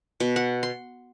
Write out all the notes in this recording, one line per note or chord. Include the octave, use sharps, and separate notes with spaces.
B2
F#5
C6